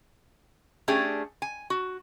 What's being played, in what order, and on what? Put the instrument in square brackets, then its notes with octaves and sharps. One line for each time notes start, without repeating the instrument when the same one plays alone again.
[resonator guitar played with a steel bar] A3 C#4 D4 G4 G#4
G#5
F#4